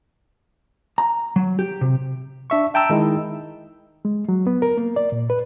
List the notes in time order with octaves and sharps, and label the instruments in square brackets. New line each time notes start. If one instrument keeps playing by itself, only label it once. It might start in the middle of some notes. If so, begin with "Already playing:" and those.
[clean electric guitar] A#5
F#3
G4
C3
[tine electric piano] D4 E5 C#6
E5 G5 A5 A#5 E6
D#3 G#3 D#4 E4
[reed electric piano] G#3
F#3
B3
A#4
A#3
D5
A#2
B4